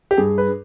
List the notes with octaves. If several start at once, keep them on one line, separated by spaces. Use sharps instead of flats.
G4
G2 G#4
B4